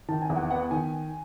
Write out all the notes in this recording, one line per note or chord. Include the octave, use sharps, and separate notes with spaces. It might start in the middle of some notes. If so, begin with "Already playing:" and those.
D#3 A5
G#5
E2
F#5
B3 F#5
D#3 G#5